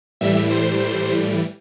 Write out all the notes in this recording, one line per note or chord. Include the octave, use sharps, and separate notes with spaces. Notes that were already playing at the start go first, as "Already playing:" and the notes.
A2 E3 G3 E5
C5